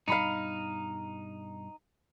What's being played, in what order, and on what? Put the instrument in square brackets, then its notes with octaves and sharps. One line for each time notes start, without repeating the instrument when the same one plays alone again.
[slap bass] G2 B2 G3 [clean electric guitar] D#4 [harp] F5 B5 C#7